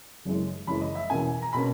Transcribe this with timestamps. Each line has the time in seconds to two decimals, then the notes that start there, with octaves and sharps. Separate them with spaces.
0.25 F#1 F#2 E3 G#3
0.67 F#1 F#2 E3 G#3 B5
0.81 D#5
0.95 E5
1.10 E2 B2 A#3 C#4 G#5
1.42 A#5
1.53 B2 A#3 C#4 B5